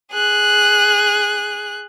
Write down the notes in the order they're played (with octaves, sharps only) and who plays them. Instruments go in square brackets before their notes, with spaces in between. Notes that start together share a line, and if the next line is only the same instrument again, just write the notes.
[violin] G#4 F#6